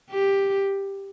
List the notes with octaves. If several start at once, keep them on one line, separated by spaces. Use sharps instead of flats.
G4